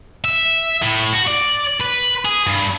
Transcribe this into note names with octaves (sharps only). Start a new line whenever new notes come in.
E5
A2
F#4
D5
B4
G#4
G2